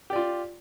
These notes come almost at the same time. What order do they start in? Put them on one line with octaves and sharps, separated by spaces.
G4 D5 F4